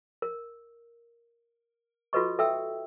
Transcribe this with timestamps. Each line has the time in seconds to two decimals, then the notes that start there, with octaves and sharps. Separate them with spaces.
0.22 A#4
2.13 F4 F#4 A4 B4 D#5 C#6
2.39 A4 E5 G5 E6